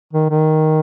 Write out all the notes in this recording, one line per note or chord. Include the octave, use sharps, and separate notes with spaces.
D#3
D#3